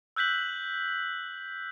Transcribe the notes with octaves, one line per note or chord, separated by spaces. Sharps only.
E6 F#6 G6 B6 F#7